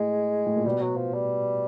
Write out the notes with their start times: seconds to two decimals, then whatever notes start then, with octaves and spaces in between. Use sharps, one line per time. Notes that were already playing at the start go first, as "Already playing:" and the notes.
Already playing: A2 G#3
0.46 A2
0.56 A#2
0.65 B2 G3
0.81 F#3
0.97 F3
1.14 G3